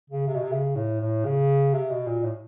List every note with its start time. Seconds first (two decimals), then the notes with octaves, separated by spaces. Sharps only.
0.10 C#3
0.27 C3
0.35 B2
0.43 C3
0.52 C#3
0.76 A2
1.01 A2
1.25 C#3
1.74 C3
1.91 B2
2.07 A#2
2.24 A2